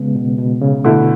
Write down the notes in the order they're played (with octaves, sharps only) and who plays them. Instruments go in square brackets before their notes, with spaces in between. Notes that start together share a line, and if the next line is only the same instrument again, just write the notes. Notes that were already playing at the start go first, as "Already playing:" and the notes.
Already playing: [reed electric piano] C#3 G#3 B3
B2
B2
C#3
[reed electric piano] B2 [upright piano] D3 A3 E4